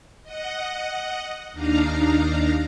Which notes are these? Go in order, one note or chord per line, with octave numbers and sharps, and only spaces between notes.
D#5 F#5
D#2 D4 D#4 F5 A#5